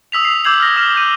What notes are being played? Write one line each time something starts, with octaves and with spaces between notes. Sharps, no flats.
D#6 E6 B6 F7
C7
D6 E6 G6 G#6 C7 F#7
F6 A#6
D#6 F6 E7
G6 D#7